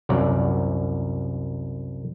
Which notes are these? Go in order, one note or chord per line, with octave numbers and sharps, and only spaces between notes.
C2 F#2 C#5 D5